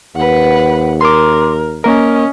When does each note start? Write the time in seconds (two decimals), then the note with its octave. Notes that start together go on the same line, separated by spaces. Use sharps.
0.16 D#2 B4 F#5
1.01 A#4 C6 D6
1.84 A#3 C#4 A#4 D#5